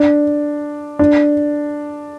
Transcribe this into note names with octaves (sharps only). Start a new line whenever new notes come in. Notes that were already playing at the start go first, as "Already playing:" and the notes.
Already playing: D4
D4